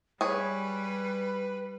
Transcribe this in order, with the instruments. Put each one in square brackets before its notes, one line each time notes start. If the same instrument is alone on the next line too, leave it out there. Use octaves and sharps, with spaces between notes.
[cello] G3 [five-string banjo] G#4 C#5 [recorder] B4